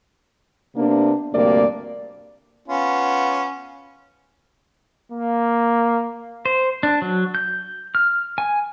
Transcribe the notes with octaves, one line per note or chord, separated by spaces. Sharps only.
C3 A#3 B3 D4
D2 G2 C3 A#3 D5
B3 C#4 F4
A#3
C5
D4
F#3
G6
F6
G#5